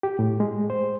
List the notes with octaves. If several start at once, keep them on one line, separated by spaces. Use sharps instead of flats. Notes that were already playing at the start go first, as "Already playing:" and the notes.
G4
A2
G#3
C5